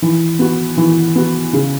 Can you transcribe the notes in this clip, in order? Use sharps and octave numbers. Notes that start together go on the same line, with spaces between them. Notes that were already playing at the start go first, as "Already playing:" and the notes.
E3
B3 F#4
E3
B3 F#4
C#3